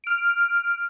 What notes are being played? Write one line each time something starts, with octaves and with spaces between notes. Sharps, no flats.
F6 D7